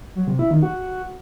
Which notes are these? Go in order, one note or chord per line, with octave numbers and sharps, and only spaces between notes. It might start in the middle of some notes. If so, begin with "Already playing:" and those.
F#3
C3
E4
D#3
F#4